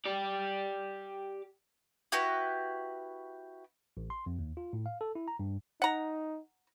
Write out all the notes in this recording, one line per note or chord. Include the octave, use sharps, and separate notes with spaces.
G4 D5
E4 F#4 G4 B4
A1
C6
F2
D#2
F4
A2
F5
A4
E4
A#5
G2
D#4 F#5 A#5